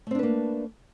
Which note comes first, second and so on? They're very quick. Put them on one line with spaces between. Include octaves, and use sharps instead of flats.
A3 C4 D4 B4 A#3